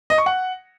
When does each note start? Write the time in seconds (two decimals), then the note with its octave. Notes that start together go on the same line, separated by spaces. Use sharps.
0.10 D#5
0.18 C#6
0.26 F#5